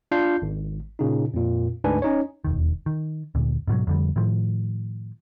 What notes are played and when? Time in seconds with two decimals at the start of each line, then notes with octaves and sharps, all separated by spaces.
0.11 D4 F4 G6 C7
0.42 G#1
0.99 A#2 C#3 D#4
1.34 F2 A#2
1.84 D2 G#2 D4 B4 G#5
2.02 C#4 D#4 C#5
2.44 E1 D#2 D#3
2.86 D#3
3.35 D2 A#2
3.67 G#2 B2 F3 F#3
3.87 F2 D3 G3
4.16 A2 D#3 F3